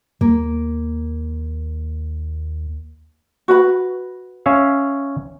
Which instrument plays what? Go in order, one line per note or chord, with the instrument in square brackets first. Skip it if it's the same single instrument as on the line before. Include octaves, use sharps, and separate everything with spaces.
[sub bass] D#2 [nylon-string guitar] A#3
[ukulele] F#4 B4 B5
[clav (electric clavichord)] C#4 E5 F5